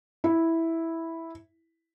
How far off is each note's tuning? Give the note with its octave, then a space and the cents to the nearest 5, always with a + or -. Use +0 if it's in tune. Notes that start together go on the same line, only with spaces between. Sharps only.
E4 -5